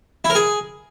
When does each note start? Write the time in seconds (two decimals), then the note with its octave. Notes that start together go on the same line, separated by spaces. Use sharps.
0.25 E4
0.30 A#4
0.35 G#4